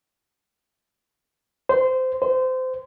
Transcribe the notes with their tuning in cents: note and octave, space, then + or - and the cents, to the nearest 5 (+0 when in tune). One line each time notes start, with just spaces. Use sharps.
C5 -20
C5 -25